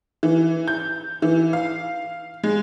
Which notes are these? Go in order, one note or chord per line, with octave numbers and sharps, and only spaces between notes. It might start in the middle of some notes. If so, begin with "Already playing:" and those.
E3
G6
E3
F5
G#3